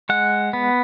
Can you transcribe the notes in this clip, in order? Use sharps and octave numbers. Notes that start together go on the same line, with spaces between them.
G#3 F#5
B3